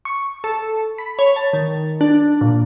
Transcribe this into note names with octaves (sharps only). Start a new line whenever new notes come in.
C#6
A4
B5
C#5
A5
D#3
D4
A#2